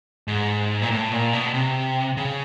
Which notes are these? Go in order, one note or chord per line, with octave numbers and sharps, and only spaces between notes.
G#2
A#2
A2
A#2
B2
C3
C#3